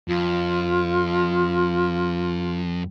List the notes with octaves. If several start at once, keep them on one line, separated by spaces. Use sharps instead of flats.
F2 F4